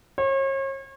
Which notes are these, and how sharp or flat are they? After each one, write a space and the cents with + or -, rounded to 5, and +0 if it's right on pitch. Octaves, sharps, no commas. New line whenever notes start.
C#5 -40